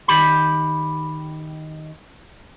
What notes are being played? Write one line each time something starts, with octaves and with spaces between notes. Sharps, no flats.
D#3 G4 B5